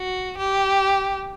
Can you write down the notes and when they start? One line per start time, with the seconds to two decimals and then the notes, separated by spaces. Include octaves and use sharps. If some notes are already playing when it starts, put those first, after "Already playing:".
Already playing: F#4
0.37 G4